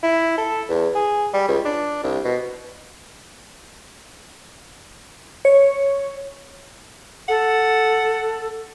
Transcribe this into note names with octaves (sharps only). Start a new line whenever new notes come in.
E4
A4
E2
G#4
G3
C#2
D4
C2
B2
C#5
A4 F#5